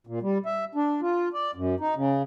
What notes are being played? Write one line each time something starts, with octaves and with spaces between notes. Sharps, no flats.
A#2
G3
E5
D4
F4
D5
F#2
D#4
C#3